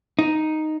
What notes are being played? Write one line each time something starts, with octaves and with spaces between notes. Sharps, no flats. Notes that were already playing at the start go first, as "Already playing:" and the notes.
D#4